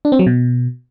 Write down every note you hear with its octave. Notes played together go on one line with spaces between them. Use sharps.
D4
C4
F#3
B2